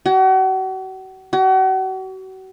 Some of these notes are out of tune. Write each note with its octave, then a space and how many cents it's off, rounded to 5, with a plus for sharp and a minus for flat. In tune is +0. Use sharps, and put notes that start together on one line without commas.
F#4 +40
F#4 +40